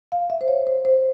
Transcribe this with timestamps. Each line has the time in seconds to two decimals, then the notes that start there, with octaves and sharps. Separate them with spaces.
0.12 F5
0.30 E5
0.41 C5
0.48 C#5
0.67 C5
0.85 C5